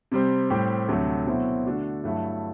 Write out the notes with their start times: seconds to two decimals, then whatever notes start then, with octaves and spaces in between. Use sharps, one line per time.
0.12 C3 G3 C4
0.50 A2 G3 C4 G4
0.88 D2 C3 F#3 A3
1.27 B2 F#3 C4 E4
1.66 D3 A3 D4 F#4
2.04 G2 F#3 A3 E4